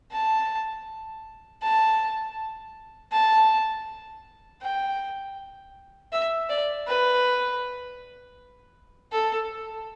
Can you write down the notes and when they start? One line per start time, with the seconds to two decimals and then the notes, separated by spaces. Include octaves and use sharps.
0.12 A5
1.63 A5
3.12 A5
4.62 G5
6.12 E5
6.49 D5
6.87 B4
9.12 A4